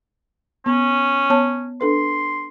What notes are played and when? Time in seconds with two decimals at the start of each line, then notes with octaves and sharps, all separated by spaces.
0.66 B3 C#4
1.30 B3 C#5 A5
1.81 D4 A4 B4 C6